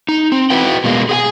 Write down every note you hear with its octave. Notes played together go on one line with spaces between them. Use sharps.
D#4
C4
E4 F#4 B4 G5
B2 G#3 A#3
G#4 F#5 G#5